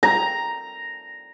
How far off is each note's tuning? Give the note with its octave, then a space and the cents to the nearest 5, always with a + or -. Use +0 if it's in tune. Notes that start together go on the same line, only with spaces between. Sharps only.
A#5 +0